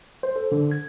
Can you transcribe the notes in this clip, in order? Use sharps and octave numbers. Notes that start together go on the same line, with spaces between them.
C5
A4
D3
G#6